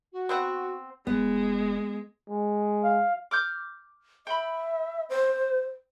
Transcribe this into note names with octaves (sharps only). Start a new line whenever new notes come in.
F#4
B3 C4 F#5
F1 G#3 B3
G#3
F5
D6 F6 G6
E5 G5 B5
C5